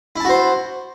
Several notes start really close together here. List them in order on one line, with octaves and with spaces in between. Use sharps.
E4 A5 F#4 C5